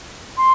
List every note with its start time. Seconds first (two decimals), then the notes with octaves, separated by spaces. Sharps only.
0.37 C6